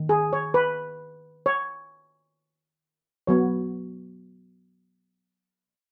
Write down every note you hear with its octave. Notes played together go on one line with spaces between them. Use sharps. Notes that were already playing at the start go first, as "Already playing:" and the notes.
Already playing: D#3
G#4
C#5
B4
C#5
F#3 B3 C#5